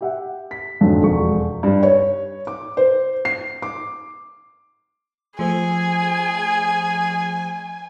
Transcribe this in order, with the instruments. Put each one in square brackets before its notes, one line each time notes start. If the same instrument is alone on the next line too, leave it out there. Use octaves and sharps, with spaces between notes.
[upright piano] G4 E5 F#5
B6
F2 G#2 D3 F#3
E1 F2 C#6
[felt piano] G2
C#5
D6
C5
C7
D6
[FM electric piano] F3 A3 C5 [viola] G#4 [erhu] G#5